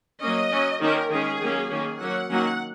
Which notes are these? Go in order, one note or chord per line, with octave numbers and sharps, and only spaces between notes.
F#3 A#3 C#4 D#5
F#3 C#4
D#3 A#3 C#4 A#4
D#3 G#3 C#4 G#4
D#3 F#3 A#3 C#4
D#3 A#3 C#4 G#4
F#3 A#3 C#4 F#5
D#3 F#3 A#3 C#4 F#5